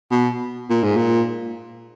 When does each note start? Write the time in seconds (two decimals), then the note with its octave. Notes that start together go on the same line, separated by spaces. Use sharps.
0.11 B2
0.70 A#2
0.84 G#2
0.97 A#2